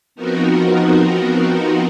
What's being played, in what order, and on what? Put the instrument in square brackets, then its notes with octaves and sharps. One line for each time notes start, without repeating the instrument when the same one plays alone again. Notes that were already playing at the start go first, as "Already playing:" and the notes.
[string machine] F3 B3 C4 D#4 F#4 A#4